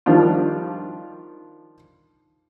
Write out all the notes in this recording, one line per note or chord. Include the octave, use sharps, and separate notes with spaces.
D#3 F3 G3 D4 F4